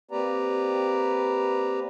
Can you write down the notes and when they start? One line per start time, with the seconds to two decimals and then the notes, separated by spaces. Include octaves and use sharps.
0.11 A#3 C4 G4 B4 D5 A#5